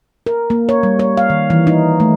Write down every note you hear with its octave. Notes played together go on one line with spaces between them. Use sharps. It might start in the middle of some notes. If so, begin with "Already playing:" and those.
A#4
A#3
C#5
G3
C#5
F5
D#3
E3
D#4
A3